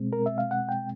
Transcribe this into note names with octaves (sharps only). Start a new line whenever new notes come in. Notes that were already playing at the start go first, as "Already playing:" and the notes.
Already playing: B2 G#3 C4
A#4
E5
F5
F#5
G5